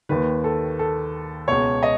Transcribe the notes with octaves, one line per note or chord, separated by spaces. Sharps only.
D#2 D#3 B4
A4
A4
C#2 B2 C#5
D#5